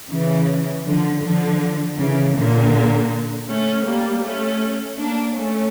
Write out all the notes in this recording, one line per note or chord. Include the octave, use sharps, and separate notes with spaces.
C#3 E3
D3 F3
D3 F3
C#3 E3
A#2 D3
A3 C#4
G3 A#3
A3 C#4
A#3 D4
A3 C#4